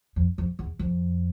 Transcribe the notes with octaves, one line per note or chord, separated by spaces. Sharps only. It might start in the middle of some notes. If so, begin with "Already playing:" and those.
F2
F2
E2
F2